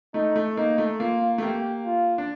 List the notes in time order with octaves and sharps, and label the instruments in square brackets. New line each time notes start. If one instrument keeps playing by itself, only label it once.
[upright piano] A3 [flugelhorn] D#4
[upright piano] A3
[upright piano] A#3 [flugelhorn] D#4
[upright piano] A3
[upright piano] A#3 [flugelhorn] F4
[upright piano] A3
[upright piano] A#3 [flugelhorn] G4
[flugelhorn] F4
[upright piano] D4